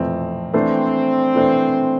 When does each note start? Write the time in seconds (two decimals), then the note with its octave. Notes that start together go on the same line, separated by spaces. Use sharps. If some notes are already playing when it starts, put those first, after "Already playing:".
Already playing: F2 E3 A3 C4
0.53 E3 A3 C4 D4 A4 C5
1.35 E3 A3 D4 A4 C5